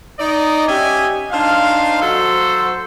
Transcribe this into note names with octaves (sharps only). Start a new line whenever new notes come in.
D#4 D5 D#5
C#4 G4 D#5 E5 G5 G#5
D4 D#4 F4 C5 F5
F#3 F#4 A4 C5